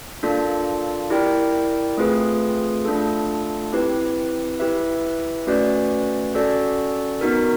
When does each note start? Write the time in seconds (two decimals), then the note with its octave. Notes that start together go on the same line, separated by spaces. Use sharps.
0.23 A#3 D4 F4 A4 D5
1.10 E4 G4 A#4 D5 G5
1.97 A3 C4 F4 G#4 B4
2.85 A3 D4 F4 A4
3.72 C4 E4 G4 B4
4.59 E4 G4 B4 E5
5.47 A3 C#4 F#4 B4 D5
6.34 C#4 F#4 A4 D5
7.21 B3 D#4 F#4 A#4